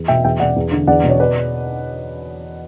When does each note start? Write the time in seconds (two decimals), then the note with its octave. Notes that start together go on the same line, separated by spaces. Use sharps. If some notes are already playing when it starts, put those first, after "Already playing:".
Already playing: E2
0.08 B2 E5 G5
0.24 E2 E5 G5
0.40 B2 D5 F#5
0.56 E2
0.71 D3
0.87 E2 D5 F#5
1.04 B2
1.09 C#5
1.20 B4 D5